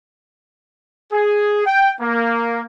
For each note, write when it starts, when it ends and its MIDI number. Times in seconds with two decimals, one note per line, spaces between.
1.13 1.62 68
1.66 1.92 79
2.00 2.64 58